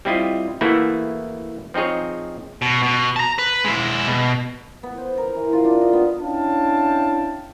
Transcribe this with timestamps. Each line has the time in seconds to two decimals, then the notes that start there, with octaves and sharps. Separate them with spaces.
0.05 G3 C4 E4 F4 D#5
0.61 E3 A3 A#3 E4 F#4 G#4
1.74 F3 C4 D#4 G#4 C#5
2.62 B2
2.83 B2
3.16 A5 A#5
3.38 B4
3.64 G#3 E4
4.07 B2
4.83 B3
4.98 C5
5.18 A#4
5.35 E3
5.53 F4
5.65 D4
5.81 D#5
5.93 B3
6.20 C#4 D4 E4 F5 G5 A5